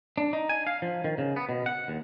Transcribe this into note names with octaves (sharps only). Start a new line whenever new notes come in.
D4
D#4
G#5
F5
F3
D#3
C#3
B3
B2
F#5
D#2